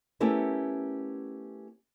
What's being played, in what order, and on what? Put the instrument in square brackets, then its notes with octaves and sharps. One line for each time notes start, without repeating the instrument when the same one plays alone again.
[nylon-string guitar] A3 B3 C#4 E4 G4 A#4